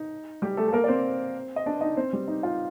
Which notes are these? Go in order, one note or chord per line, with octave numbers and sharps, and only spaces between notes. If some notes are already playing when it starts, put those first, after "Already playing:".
Already playing: D#4
G3 G4
A3 A4
A4
A#3 A#4
D5
C4 C5
D#5
D4 D5
D#4 D#5
C4 C5
G3 G4
D#4
F4